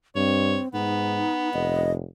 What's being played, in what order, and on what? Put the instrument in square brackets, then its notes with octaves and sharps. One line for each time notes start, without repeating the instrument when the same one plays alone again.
[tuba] G2 [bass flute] C4 [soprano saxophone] C#5
[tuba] G#2 [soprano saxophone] B3 [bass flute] D#4
[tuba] F1 [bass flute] D#5